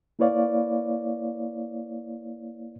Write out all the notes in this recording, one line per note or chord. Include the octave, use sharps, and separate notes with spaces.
A#3 E4 B4 C#5 D5 F5